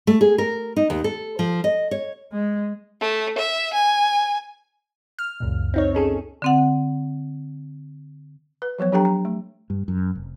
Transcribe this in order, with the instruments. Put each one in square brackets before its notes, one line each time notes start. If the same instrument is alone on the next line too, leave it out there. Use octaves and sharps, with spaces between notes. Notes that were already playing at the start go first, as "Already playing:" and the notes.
[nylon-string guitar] A3
G#4
A#4
D#4
D#2
A4
F3
D#5
C#5
[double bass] G#3
[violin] A3
E5
G#5
[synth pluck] F6
C#2 F#2 A#2
C4 D#4 C#5
C#4 G#4 A4
[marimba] D3 C4 F#5
[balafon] B4
F3 F#3 B3 C#5
F#3 D4 G4 A4 G5 A#5
A#5
A3
[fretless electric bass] G2
F#2
F1